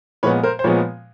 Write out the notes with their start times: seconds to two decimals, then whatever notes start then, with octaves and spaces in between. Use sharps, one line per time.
0.23 A#2 F3 G#3 B3 B4 C#5
0.43 A#4 C5
0.59 C5
0.64 A#2 F3 G#3 B3 B4 C#5